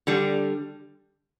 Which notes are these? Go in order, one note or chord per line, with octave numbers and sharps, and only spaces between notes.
D3 G3